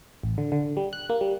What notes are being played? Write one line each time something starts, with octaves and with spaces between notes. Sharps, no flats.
A1
D3
D3
G3
F#6
A#3
G3